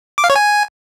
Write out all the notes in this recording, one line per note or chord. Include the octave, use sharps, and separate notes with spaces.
D6
F5
C#5
G#5